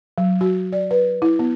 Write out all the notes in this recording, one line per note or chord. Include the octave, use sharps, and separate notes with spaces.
F#3
F#4
D5
B4
E4
B3